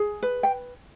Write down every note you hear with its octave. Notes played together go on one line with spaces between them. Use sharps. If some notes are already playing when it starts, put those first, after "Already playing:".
Already playing: G#4
B4
G5